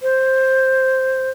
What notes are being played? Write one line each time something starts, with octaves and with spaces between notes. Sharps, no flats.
C5